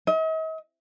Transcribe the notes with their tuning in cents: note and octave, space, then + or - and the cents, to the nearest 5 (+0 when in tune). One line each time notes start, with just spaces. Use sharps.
D#5 +45